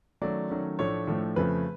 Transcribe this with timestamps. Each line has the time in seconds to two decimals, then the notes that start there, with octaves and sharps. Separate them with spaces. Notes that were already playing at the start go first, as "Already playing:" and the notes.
0.22 D#3 F#3 A3 C#4 D5
0.50 D#3 F#3 A3 C#4
0.79 A2 F3 A3 D4 C#5
1.07 A2 F3 A3 D4
1.36 F2 C#3 F3 A3 B4